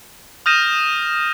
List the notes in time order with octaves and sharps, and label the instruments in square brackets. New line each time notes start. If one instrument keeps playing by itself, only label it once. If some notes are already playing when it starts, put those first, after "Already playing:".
[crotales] D#6 F6 G6 A#6 D#7 E7